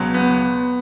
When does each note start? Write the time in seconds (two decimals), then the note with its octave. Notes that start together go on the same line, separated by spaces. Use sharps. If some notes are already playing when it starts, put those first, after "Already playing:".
Already playing: C#2 B2 F#3
0.14 B3